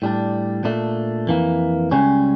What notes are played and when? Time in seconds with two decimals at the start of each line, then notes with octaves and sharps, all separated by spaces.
0.02 A2 G3 D4
0.64 A#2 A3 D4
1.27 F2 E3 A#3
1.91 C#2 C#3 G3 C#4